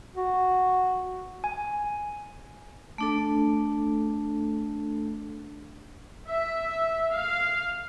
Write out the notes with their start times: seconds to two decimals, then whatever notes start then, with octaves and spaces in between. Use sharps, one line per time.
0.16 F#4
1.44 G#5
2.98 A3 D4 A4
6.29 E5
7.12 F5